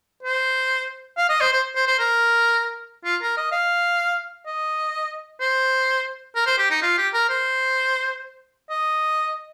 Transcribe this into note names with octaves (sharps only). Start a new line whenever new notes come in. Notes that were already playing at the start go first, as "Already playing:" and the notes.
C5
F5
D#5
C5
C5
C5
C5
A#4
F4
A#4
D#5
F5
D#5
C5
A#4
C5
G4
D#4
F4
G4
A#4
C5
D#5